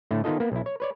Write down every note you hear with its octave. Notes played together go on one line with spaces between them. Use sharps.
A2 D3 A3
D#3 B3 D#4 F4 A4 D#5
A#3 B3 A#4
B1 E4
C#5
B4 C#5 D5